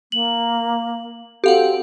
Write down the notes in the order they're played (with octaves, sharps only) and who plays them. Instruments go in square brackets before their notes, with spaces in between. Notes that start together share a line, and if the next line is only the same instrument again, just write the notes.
[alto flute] A#3 [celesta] F#7
[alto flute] C4 [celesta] F#4 A4 [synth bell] G4 F5 F#5